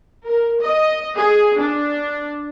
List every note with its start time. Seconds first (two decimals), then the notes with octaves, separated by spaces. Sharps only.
0.25 A#4
0.62 D#5
1.17 G#4
1.58 D4